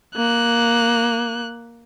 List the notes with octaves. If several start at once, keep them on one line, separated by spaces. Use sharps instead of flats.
A#3 F#6